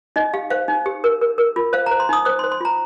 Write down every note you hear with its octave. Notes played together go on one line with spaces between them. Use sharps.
D#4 D#5
G4 F5
C5 F5
D#4
G4
A#4
A#4
A#4
F4
C5 F5
C5 A#5
C6
D#4 D#6
C5 D#6
C6
C5
C6
F4 A#5